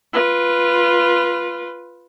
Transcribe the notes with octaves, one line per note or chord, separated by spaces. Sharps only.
F4 B4